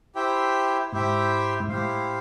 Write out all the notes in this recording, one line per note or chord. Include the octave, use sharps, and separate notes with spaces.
E4 G4 C5 E5 G5
G#2 E4 G4 C5 E5 G5
G#2
A2 E4 G4 C5 F5